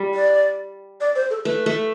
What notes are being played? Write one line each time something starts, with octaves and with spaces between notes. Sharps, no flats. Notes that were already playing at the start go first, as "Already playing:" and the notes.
Already playing: G3
D5
D5
C5
A4
A3 B4
A3